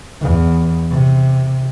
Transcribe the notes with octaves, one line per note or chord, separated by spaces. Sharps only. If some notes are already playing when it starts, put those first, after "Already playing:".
E2
C3